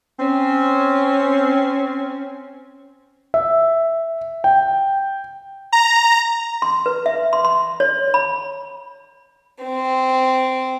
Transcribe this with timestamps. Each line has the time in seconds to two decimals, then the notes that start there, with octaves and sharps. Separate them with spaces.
0.20 C4 C#4
3.34 E5
4.44 G5
5.72 A#5
6.62 C6
6.86 B4
7.06 E5
7.33 C6
7.45 C6
7.80 C#5
8.14 B5
9.63 C4